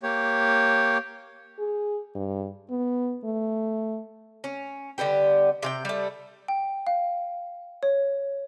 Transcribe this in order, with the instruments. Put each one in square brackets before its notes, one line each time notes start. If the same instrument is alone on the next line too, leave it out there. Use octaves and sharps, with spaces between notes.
[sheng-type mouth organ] A#3 G4 C#5
[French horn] G#4
G2
B3
A3
[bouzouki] C#4
D3 G3 B3 G4
C3 G#4 G5
G3 A3
[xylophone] G5
F5
C#5